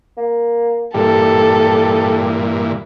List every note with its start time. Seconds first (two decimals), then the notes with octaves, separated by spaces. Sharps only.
0.17 A#3
0.94 G2 A#2 E3 G4 A4